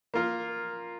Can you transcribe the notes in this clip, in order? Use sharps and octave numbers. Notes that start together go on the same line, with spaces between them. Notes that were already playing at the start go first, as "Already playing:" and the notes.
A#3 F4 A#4